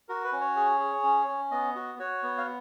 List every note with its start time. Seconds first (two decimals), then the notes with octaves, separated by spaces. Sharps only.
0.09 F#4 A#4
0.24 B4
0.32 C#4
0.41 C#5
0.56 G#4
0.80 G#4
1.03 C#4
1.28 C#4
1.51 B3 D#5
1.76 F#4
1.99 F#4 C#5
2.23 B3
2.38 F5